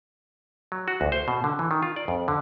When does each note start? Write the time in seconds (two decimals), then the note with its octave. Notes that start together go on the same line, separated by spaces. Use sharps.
0.72 F#3
0.88 F#4
1.01 D2
1.12 C5
1.28 B2
1.44 D3
1.59 E3
1.71 D#3
1.83 F4
1.96 D5
2.08 F2
2.28 D3